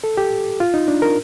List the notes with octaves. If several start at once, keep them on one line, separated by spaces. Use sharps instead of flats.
A4
G4
F4
D#4
D4
A#4